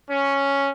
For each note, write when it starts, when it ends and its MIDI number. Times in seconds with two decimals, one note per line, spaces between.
0.11 0.70 61